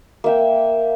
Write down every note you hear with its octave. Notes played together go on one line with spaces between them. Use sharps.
A#3 E5 G5